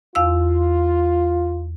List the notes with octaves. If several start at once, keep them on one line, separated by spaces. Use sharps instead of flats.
E2 F4 F5 E6